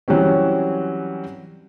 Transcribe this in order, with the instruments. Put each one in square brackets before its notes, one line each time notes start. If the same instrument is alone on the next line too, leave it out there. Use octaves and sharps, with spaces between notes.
[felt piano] E3 F#3 G3 C4 C#4